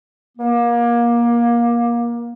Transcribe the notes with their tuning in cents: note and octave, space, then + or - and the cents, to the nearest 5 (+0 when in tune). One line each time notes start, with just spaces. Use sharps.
A#3 +25